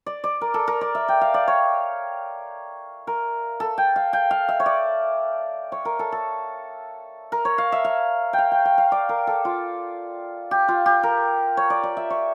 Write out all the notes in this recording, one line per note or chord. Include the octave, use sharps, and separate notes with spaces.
D5
D5
A#4
A4
A#4
D5
E5
G5
F5
D5
C#5
A#4
A4
G5
F5
G5
F5
E5
C#5
D5
C#5
A#4
A4
A4
A#4
C#5
F5
E5
F5
G5
F5
G5
G5
F5
D5
A#4
A4
F4
G4
F4
G4
A#4
C#5
D5
D5
E5
C#5